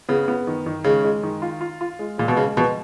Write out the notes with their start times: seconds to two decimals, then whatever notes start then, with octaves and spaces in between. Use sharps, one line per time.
0.09 C#3 B3
0.28 B3
0.47 D#3
0.66 D#3
0.84 C#3 G#3
1.04 G#3
1.23 D#3
1.42 F4
1.61 F4
1.81 F4
1.99 G#3
2.18 A#2 G#3
2.28 B2
2.37 C#3 G#3
2.56 B2 F3